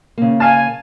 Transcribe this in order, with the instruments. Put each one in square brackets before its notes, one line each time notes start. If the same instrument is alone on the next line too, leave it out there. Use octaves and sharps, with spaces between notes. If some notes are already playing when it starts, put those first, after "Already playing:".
[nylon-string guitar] C#3 A#3
[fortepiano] F5 A5 [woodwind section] G#5